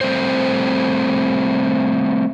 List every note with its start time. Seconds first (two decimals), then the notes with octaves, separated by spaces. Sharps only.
0.01 G3 A3 C4 C5